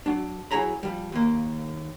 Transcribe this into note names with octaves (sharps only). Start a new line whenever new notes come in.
F#3 D4
F#3 E4 G#4 C#5 A#5 B5
F3 G3
D#2 A#3